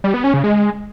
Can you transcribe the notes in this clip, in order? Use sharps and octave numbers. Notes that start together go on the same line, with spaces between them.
G3
B3
C#4
C#3
G#3